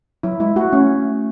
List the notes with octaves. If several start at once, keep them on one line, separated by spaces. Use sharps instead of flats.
F#3 E4
G#3 E4
A3 F#4
A3 C#4